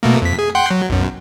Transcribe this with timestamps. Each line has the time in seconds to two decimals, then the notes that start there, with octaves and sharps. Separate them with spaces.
0.03 B2 A3 A#3
0.22 F2 B6
0.39 G#4
0.55 F#5 G5 C6
0.71 F#3
0.90 B1 F#2